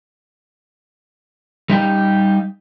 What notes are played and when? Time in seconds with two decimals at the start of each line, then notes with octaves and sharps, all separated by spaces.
1.70 G3 D#4 G4